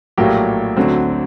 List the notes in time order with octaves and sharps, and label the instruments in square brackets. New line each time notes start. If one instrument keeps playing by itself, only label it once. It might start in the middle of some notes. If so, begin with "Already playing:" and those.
[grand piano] A#1 A2 F#3 A#3 G4
D2 D3 F#3 C4